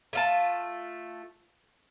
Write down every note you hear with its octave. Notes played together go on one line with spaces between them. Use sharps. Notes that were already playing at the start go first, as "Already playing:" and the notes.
A3 F4 A5